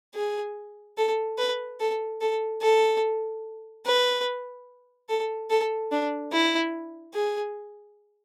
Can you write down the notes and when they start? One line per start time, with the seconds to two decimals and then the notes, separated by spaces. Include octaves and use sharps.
0.15 G#4
0.98 A4
1.38 B4
1.80 A4
2.21 A4
2.62 A4
3.85 B4
5.09 A4
5.50 A4
5.92 D4
6.32 E4
7.14 G#4